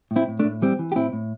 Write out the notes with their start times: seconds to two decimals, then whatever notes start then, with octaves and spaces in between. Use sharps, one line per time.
0.11 A2
0.16 C4 E4
0.28 A2
0.39 A3 D4
0.44 A2
0.62 E3 G3 C4
0.79 E3
0.92 G4
0.95 A2 C4 E4
1.13 A2